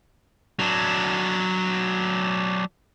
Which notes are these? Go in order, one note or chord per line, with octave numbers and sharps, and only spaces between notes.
F#3 D4